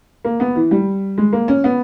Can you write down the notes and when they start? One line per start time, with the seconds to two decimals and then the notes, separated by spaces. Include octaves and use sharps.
0.25 A#3
0.40 B3
0.56 E3
0.71 G3
1.18 G#3
1.33 A#3
1.48 C#4
1.64 B3